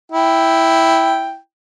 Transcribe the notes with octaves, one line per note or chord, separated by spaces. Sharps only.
E4 G5